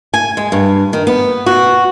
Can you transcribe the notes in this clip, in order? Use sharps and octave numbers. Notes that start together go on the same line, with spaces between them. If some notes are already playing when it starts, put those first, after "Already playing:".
G#5
G#3
G2
D#3
B3
F#4